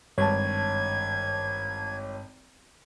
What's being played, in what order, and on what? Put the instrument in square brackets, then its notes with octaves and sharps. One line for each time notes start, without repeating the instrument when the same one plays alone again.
[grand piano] G#1 [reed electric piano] G2 [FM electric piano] C#5 A5 [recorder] G#6